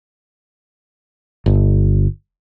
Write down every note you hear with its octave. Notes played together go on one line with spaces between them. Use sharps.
G1